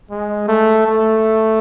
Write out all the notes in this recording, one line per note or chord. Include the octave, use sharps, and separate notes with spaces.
G#3
A3
A3